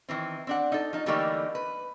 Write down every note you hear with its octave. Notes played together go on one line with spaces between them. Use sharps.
D#3 E3 C4
C4 D4 F#5
D#4 A4
F3 D#4
D3 E3 G3 A3 A#3 D#4
B4